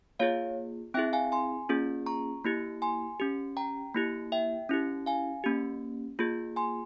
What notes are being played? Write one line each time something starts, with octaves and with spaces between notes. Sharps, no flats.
A#3 F4 G#4 C#5 F5
C4 E4 G#4 E5 G5
F5 G#5
G#5 C6
A#3 C#4 F4 G#4
A#5 C#6
A#3 E4 G4
G#5 C6
C#4 G4
G5 A#5
A#3 E4 G4
E5 G5
C#4 E4 G4
F5 G#5
A#3 C#4 G4
A#3 F4 G#4
G#5 C6